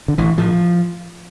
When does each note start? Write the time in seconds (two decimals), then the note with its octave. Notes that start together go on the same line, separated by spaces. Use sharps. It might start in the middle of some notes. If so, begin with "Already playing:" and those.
0.08 D3
0.18 A1 E3
0.38 A2 F3